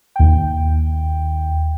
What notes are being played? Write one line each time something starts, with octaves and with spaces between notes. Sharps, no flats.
D#2 G5